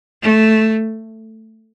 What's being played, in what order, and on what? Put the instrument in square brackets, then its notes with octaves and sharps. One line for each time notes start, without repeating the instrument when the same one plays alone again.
[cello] A3